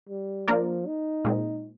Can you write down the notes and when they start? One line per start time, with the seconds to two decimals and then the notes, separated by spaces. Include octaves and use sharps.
0.09 G3
0.48 F3 A#3 D4 F4 A#4 D5
0.87 D#4
1.25 A#2 G#3 C4